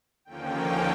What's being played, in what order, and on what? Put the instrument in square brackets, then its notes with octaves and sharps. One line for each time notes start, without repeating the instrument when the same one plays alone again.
[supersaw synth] D#2 D3 F3 A#3 C#4 G5